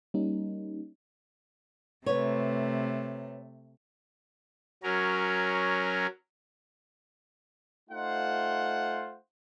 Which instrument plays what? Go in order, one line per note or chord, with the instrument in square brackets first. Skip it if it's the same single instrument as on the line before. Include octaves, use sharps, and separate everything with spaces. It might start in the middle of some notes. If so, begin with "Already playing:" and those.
[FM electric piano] G3 A#3 C#4 D#4
[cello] C3 A3 [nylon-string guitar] B4 C#5
[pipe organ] F#3 C#4 A#4
[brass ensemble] A3 D#4 F4 C5 F#5